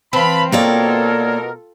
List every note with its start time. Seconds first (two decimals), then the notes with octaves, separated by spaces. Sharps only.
0.13 E3 C4 B4 F5 A5 B5
0.52 B2 A#3 F4 A4 A#4 C#5 D5